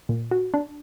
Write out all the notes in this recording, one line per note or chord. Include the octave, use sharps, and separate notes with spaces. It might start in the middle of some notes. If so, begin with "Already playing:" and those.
A#2
F#4
D4